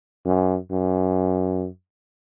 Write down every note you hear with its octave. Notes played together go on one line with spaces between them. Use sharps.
F#2
F#2